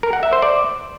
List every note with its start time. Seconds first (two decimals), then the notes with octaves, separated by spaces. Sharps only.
0.03 A#4
0.13 F#5
0.23 E5
0.33 C5
0.42 D5